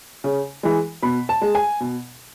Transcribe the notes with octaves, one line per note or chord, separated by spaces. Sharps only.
C#3
E3 G#3
B2 B5
A5
G#3
G#5
B2